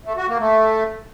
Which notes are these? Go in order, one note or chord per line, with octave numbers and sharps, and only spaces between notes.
A3
F#4
A#3
A3